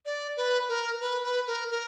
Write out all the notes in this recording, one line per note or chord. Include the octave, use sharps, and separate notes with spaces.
D5
B4
A#4
B4
B4
A#4
A#4